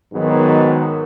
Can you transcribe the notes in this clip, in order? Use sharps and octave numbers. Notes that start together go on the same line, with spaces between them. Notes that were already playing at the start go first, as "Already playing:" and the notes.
G#2 D#3 F#3 B3